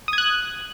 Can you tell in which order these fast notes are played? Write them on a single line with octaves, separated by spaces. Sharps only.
D#6 G#6 F#6